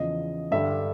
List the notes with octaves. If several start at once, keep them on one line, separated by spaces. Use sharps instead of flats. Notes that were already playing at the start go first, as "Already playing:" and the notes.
Already playing: E2 C#3 F3 D#5
G2 D3 G3 E5